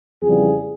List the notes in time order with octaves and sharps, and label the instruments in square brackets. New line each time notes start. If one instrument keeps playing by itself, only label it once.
[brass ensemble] F2 C#3 E3 G3 G#4